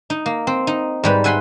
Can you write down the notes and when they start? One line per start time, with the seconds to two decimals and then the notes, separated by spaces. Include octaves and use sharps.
0.10 D#4
0.26 A#3
0.47 C4
0.67 D#4
1.04 G#2 G3 B4
1.24 E5 F#5 G#5 B5 C6